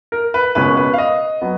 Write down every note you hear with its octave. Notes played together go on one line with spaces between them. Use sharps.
A#4
B4
C#2 B2 A#3 C#4 B4
B4
F5
D#5
F#3 B3